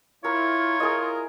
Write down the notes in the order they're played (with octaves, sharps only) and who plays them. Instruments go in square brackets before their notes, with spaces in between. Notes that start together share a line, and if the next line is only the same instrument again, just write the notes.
[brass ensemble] E4 [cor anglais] F4 [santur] A#4 [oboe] C#5
[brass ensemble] E4 A#4 [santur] G#4 D#5